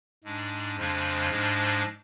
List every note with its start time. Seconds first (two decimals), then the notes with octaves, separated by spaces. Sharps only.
0.24 G#2 G#3 D4
0.76 F2 C#3 F3 G#3 D4
1.29 G#2 F3 G#3 D4 F6